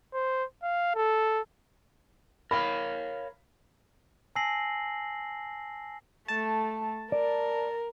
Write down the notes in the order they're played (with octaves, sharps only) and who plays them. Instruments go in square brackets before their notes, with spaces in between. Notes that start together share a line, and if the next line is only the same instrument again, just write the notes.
[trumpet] C5
F5
A4
[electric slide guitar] A#4 C#5 F5 [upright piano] B5 F6
[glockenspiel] G#5 A5 E6 A#6 C7 F#7
[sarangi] A3 [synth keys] A5
[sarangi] A#4 [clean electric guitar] D5